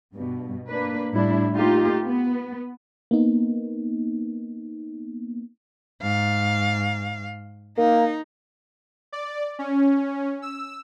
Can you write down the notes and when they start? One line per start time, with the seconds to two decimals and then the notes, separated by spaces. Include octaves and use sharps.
0.14 G2 B2
0.68 A#3 D4 B4
1.12 A2 G3 D4 E4
1.55 A3 A#3 D#4 F4 G4
2.04 B3
3.11 A#3 B3 D#4
6.02 G#2 F5
7.77 A#3 D#4
9.12 D5
9.59 C#4
10.42 E6